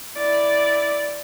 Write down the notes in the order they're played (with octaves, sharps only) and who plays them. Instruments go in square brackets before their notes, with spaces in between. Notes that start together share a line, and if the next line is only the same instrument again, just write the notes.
[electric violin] E4 D5